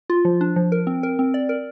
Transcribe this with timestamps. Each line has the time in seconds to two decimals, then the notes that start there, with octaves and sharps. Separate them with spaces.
0.10 F4
0.25 F3
0.41 D4
0.56 F3
0.72 A#4
0.87 C4
1.03 A#4
1.19 C4
1.34 D5
1.49 A#4